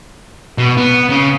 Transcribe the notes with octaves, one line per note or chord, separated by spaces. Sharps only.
B2
B3
C#3